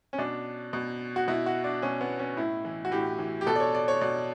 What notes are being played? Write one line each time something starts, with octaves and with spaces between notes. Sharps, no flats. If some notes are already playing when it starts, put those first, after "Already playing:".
C#4
B2 D4
B2
F#4
B2 E4
F#4
D4
B2 C#4
B3
C#4
A2 E4
E3
F#4
A2 G4
E3
G4
B2 A4
D5
C#5
D5
C#5
B2 D5